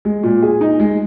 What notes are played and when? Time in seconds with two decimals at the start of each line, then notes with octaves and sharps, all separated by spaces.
0.05 G#3
0.23 A#2
0.42 G#4
0.61 D#4
0.80 G#3